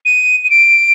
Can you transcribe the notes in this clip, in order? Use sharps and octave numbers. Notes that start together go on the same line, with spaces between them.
D#7
D#7
D7